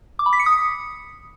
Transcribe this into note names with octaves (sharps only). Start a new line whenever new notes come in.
D6
B5
B6
C#7
D#6